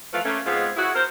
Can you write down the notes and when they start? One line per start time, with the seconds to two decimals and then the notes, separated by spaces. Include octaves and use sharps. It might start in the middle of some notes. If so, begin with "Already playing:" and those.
0.13 E3 F3 A3 F4 B4 F5
0.25 A3 A#3 C#4
0.46 G#2 G#3 B3 C4 F4 G#4
0.77 E4 F#4 G#4
0.95 A#4 C5